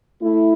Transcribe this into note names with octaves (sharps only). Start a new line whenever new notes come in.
A3 E4